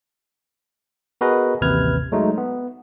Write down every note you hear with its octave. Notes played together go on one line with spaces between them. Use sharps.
B3 F#4 G#4 A#4 B4 D#5
A1 D#2 C3 B4 F6 G#6
F#3 G#3 A3 D#4
B3